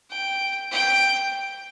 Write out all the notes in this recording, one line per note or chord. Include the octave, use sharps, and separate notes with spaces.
G5
G5